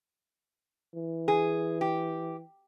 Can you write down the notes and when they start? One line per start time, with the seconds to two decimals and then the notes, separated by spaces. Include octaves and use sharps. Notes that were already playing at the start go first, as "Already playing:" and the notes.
0.95 E3
1.28 G#4
1.81 G4